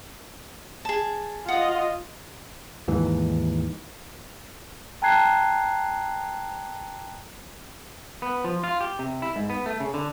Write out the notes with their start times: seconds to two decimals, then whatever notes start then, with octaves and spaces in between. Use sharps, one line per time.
0.85 G#4 A5
1.48 F4 D#5 F#5 D#6
2.88 D#2 G#2 E3
5.02 G5 A5 A#5 F#6 G#6 C7
8.22 B3
8.44 F3
8.64 F4
8.81 G4
8.99 C3
9.22 E4
9.36 G#2
9.50 B3
9.66 A3
9.80 C#3
9.94 D3